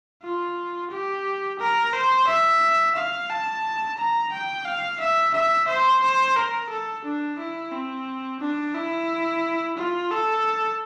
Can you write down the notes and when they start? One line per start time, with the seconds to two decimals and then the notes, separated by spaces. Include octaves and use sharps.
0.23 F4
0.91 G4
1.59 A#4
1.93 C5
2.27 E5
2.96 F5
3.30 A5
3.98 A#5
4.32 G5
4.65 F5
5.00 E5
5.34 E5
5.68 C5
6.02 C5
6.36 A#4
6.70 A4
7.04 D4
7.39 E4
7.72 C4
8.41 D4
8.75 E4
9.77 F4
10.11 A4